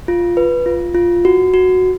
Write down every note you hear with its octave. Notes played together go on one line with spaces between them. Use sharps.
F4
B4
F4
F4
F#4
F#4